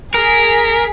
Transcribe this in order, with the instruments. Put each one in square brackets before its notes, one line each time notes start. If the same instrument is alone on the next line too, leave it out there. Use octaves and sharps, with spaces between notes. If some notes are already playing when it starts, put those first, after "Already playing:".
[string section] G#4 B6 [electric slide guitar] A#4